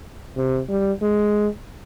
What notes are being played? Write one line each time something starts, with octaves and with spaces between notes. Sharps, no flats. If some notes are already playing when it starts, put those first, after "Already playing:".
C3
G3
G#3